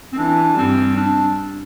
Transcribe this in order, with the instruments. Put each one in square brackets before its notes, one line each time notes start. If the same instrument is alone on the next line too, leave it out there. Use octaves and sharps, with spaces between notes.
[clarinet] C4
[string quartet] E3 [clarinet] D4
[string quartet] G2 G3 [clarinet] C4
[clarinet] D4